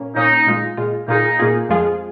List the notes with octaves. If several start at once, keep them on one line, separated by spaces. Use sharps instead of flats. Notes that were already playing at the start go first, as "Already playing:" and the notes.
Already playing: A#2 A#3 C#4
A#2 A#3 C#4 D#4
A#2 G#3 F4
A#2 G#3 F4
A#2 A#3 D#4 F4 G#4
A#2 A#3 F4 G#4
F2 F3 G#3 F4 G#4